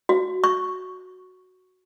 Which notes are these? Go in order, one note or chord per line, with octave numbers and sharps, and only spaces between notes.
F#4
C#6